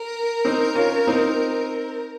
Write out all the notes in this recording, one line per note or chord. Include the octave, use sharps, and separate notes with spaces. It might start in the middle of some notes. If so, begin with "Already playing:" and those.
Already playing: A#4
C4 D#4
C#4 F4
C4 D#4